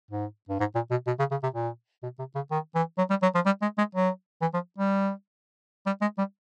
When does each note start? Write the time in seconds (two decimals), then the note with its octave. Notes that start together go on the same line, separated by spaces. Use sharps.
0.11 G#2
0.49 G2
0.60 G#2
0.75 A#2
0.91 B2
1.07 B2
1.19 C#3
1.31 C#3
1.43 C3
1.54 A#2
2.03 B2
2.19 C3
2.35 C#3
2.51 D#3
2.75 E3
2.98 F#3
3.10 G3
3.23 F#3
3.35 F3
3.46 G3
3.62 G#3
3.78 G#3
3.95 F#3
4.42 E3
4.54 F3
4.78 G3
5.86 G3
6.02 G#3
6.18 G3